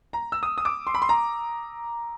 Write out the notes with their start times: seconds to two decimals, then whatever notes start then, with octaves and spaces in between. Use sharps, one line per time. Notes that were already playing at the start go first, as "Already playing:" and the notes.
0.13 A#5
0.32 E6
0.43 D#6
0.58 D#6
0.65 D6
0.87 C6
0.94 B5
1.02 C6
1.09 A#5